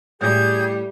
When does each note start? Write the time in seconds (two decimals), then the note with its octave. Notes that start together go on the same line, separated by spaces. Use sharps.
0.21 A2 G3 G#4 G6 G#6